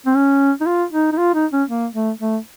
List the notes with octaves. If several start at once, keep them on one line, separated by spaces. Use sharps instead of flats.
C4
C#4
D#4
F4
D#4
D#4
F4
D#4
C#4
A#3
A3
A3